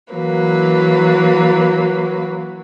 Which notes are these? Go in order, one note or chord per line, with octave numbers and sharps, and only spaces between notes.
E3 F#3 A#3 B4